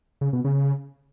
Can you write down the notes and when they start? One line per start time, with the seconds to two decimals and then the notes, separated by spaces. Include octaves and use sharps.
0.21 C#3
0.33 B2
0.44 C#3